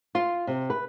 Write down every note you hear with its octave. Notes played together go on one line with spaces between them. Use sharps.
F4
C3
B4